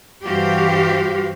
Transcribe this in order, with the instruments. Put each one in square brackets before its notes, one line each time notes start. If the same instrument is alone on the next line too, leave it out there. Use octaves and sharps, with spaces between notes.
[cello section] G2 E3 F#4 G4 C5 F5